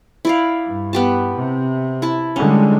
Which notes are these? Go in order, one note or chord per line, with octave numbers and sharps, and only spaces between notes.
E4 D5 F5
G2
B3 G4 A5
C3
E4 A5
D3 G3 G#3 C#4